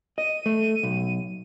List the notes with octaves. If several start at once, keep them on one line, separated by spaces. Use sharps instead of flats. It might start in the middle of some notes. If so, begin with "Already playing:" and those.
D#5 D#7
A3
B1